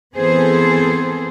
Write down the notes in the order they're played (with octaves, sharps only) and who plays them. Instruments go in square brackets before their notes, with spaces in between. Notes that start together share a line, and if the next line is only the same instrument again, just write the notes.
[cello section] E3 B3 C4 G#4 A4 C5